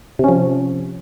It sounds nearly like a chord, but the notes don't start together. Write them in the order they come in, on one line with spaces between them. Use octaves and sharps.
C3 C#4 F3